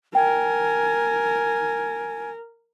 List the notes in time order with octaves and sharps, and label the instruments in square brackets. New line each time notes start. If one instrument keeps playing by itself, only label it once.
[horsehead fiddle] A#4 [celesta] G5 [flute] G#5